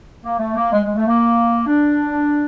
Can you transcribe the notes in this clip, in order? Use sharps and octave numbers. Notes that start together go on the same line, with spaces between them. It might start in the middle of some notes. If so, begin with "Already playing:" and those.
A#3
A3
A#3
G#3
G#3
A3
A#3
D4